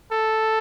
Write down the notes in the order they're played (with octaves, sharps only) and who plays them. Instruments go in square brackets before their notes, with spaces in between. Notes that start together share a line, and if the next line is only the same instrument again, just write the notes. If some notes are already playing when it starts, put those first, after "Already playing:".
[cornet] A4